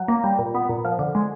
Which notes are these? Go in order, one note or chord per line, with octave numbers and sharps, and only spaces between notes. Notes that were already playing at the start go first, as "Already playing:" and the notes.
Already playing: F#3
A#3
G3
A#2
B3
A#2
F3
D3
G#3